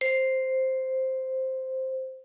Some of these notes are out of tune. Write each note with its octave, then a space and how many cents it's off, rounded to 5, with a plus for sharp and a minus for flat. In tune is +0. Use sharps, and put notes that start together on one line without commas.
C5 +0